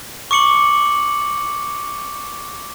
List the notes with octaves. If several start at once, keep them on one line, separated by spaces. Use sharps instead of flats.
C#6 D6 C#7 F#7